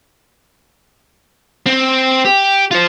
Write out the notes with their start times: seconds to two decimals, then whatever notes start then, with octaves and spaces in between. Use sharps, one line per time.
1.66 C4
2.25 G4
2.71 F4 C5